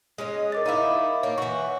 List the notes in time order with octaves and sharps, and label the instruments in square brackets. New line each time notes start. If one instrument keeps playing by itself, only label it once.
[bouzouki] G#3 C#4 D#5
[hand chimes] A#4 D6 A6
[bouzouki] D#4 E4 [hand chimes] D#5 F5 D6
[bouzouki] A#3 [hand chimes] C#5
[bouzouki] E3 F#4 [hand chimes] C#6